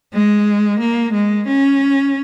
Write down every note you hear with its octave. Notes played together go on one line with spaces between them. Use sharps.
G#3
A#3
G#3
C#4